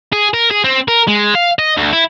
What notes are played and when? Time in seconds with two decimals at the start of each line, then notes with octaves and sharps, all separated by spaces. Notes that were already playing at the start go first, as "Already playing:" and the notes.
0.13 G#4
0.34 A#4
0.51 G#4
0.64 C4
0.88 A#4
1.08 G#3
1.35 F5
1.59 D#5
1.77 D2
1.93 E4